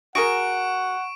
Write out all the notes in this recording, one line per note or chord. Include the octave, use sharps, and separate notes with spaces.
F#4 G#4 A#4 F#5 C#6 D7